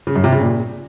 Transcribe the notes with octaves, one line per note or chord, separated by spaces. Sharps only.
C#3
F#2
C3
C#3
A#2